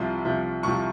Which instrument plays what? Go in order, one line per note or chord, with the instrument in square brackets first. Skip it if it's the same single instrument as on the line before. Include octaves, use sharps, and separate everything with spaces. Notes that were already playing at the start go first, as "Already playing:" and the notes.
Already playing: [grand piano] C2 C3 F3 C6
C2 C3 F3
C2 C3 F3 C#6